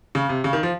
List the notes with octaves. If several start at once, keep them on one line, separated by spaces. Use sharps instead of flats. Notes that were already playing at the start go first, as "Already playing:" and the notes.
C#3
C3
C#3
D#3
F3